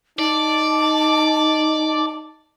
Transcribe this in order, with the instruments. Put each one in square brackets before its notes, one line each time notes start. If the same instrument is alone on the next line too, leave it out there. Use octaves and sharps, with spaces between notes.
[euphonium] D#4 [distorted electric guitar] D5 [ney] A5